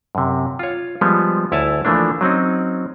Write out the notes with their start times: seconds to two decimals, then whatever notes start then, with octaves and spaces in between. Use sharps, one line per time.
0.15 F#2 C3
0.59 F4 C#5
1.01 F3 G3 G#3 B3
1.52 D2 E4 C#5 D5 G#5 A5
1.85 E3 F3 A3 A#3 D4
2.21 F#3 C4 C#4 D#4